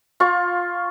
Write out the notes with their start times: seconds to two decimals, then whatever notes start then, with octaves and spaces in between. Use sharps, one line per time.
0.20 F4 C#6